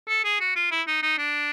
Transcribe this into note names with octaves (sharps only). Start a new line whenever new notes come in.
A4
G#4
F#4
F4
E4
D#4
D#4
D4